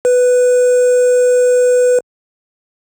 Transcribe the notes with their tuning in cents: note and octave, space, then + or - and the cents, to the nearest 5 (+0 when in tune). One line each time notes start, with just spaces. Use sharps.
B4 +5